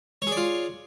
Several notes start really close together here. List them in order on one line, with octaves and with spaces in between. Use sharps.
C#5 G#4 D5 F4